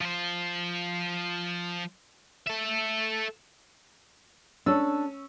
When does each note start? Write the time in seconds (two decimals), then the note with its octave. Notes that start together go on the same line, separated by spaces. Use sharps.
0.01 F3 C5
2.47 A4 E5
4.66 C#4 D4 A4 E6